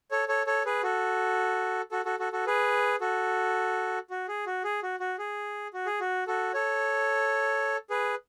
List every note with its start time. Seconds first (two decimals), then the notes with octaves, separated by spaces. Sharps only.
0.11 A4 C#5
0.28 A4 C#5
0.47 A4 C#5
0.65 G#4 B4
0.83 F#4 A4
1.92 F#4 A4
2.05 F#4 A4
2.19 F#4 A4
2.32 F#4 A4
2.46 G#4 B4
3.01 F#4 A4
4.10 F#4
4.28 G#4
4.46 F#4
4.64 G#4
4.83 F#4
5.00 F#4
5.19 G#4
5.74 F#4
5.86 G#4
6.00 F#4
6.27 F#4 A4
6.54 A4 C#5
7.90 G#4 B4